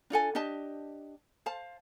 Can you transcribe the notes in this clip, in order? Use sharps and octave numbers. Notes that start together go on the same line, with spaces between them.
D4 F4 A4 G#5
D4 G4 D#5 A5
C5 F5 A5